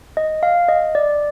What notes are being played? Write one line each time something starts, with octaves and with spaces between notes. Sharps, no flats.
D#5
F5
D#5
D5